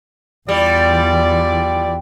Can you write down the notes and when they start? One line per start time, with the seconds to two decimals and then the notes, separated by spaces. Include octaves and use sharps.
0.49 E2 E3 G3 E4 F4 D5